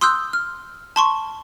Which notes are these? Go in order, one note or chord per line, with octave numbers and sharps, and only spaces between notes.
C6 D#6 E6 F#6 G6
F6
A5 C6 C#6